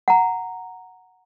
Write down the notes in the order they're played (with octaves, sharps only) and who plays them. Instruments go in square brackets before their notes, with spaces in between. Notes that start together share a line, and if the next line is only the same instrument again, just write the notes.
[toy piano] F#5 A#5